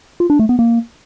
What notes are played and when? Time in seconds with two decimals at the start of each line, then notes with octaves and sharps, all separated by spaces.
0.20 F4
0.30 D4
0.39 A3
0.49 B3
0.59 A#3